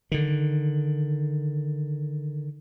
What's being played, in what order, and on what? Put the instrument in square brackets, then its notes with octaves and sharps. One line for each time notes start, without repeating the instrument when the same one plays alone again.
[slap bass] D3 D#3